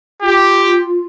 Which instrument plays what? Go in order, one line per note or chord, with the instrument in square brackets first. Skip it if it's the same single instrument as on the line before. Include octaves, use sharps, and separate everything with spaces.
[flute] F4 [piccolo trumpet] G4